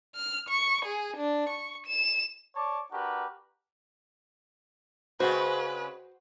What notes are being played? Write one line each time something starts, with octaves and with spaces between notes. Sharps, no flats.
F6
C#6
G#4
D4
C#6
E7
C#5 D5 A5 D6
D4 F#4 G4 A#4 B4
C#3 G#3 C4 F#4 B4 C5